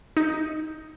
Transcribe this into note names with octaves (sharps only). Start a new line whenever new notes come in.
D#4